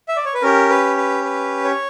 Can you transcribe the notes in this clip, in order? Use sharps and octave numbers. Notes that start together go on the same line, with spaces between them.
E5
D5
C#5
B4
C#4 G4 A#4
B4
B4
B4
C#5